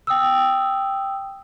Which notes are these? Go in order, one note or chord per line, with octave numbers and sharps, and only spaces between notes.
G5 D#6 E6